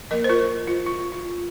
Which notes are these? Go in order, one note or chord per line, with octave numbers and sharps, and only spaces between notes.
F3 A#3 A#4 D#5
C5
F4 A#4
F4
F4
F4